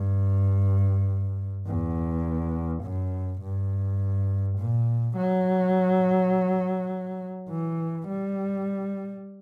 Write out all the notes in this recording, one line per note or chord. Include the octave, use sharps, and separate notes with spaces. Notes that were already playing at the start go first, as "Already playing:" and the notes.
Already playing: G2
E2
F#2
G2
A#2
F#3
E3
G3